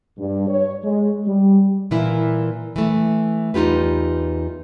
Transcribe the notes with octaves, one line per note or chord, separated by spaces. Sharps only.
G2
C#5
G#3
G3
A#2 E3 A#3 E4
E3 A3
E2 D#4 F4 G4 B4